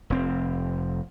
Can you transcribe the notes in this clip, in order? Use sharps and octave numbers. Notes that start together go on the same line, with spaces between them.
F1 C4